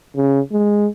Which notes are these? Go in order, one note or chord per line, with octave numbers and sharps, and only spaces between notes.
C#3
G#3